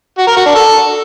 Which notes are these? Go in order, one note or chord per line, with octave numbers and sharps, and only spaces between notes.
F#4
A#4
F#4
D4
A4